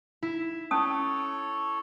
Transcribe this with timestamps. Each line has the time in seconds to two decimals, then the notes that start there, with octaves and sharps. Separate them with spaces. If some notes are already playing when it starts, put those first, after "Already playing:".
0.22 E4
0.71 C#4 A4 C#5 A5 D#6